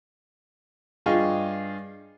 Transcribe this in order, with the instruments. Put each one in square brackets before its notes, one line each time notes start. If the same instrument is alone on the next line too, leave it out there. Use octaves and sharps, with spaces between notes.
[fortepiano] G2 F4 G#4 D#5 G5 C#6